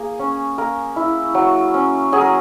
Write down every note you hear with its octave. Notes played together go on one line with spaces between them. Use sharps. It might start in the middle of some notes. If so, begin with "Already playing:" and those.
Already playing: A#3 G#4
C#4
A#3 A#4
E4
F#3
C#4
F#3 G#4
A#4